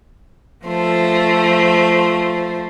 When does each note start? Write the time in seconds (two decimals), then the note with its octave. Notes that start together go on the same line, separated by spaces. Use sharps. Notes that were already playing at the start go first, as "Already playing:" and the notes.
0.66 F3 A3 C5